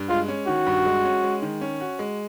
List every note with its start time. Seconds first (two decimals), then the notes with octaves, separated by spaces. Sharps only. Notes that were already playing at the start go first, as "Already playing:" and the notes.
Already playing: G2
0.09 G#3 F4
0.28 C#4
0.47 D#3 F#4
0.67 G2
0.85 G#3
1.05 C#4
1.23 G#3
1.42 D#3
1.61 C#4
1.80 F#4
1.99 G#3